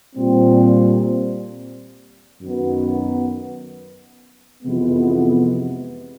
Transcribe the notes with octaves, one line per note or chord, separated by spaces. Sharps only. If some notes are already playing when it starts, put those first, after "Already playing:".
A#2 G3 C4
F#2 D#3 F#3 B3
F2 C3 E3 G#3 B3